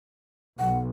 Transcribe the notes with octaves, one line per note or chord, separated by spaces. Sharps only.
B1 F#5